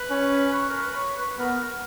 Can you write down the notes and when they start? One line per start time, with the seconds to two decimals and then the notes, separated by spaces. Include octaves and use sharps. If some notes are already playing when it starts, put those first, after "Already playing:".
Already playing: B4
0.11 C#4
0.53 C#5
0.69 A#4
0.82 B4
0.95 C#5
1.16 B4
1.38 B3 A#4
1.52 A#4